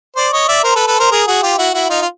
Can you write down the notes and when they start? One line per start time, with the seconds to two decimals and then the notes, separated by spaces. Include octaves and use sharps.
0.16 C5 D5
0.33 C#5 D#5
0.48 D5 E5
0.64 A#4 C5
0.76 A4 B4
0.87 A4 B4
0.99 A#4 C5
1.11 G#4 A#4
1.27 F#4 G#4
1.43 F4 G4
1.58 E4 F#4
1.74 E4 F#4
1.89 D#4 F4
2.02 F4